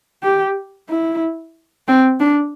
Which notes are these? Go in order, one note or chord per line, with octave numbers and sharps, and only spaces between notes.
G4
E4
C4
D4